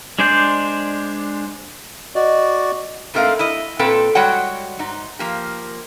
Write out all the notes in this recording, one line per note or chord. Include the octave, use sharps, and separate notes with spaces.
G#3 D4 C5 D5 G6
F#4 D5 D#5
G#2 A3 C4 A#4 D#5 F5
E4 D#5
A#2 C4 A4 B4 G5
G3 G#3 F#4 C#5 F#5 G5
G#2 D#4
F3 A#3 G4